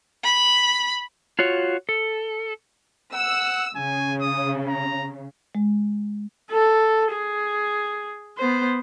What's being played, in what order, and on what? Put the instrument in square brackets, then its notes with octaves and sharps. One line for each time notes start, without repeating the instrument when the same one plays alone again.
[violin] B5
[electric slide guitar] F4 F#4 C#5
A4
[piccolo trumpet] F#5 [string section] E6
[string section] C#3 [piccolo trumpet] G#5
[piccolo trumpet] D#6
A#5
[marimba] G#3
[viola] A4
G#4
B3 C5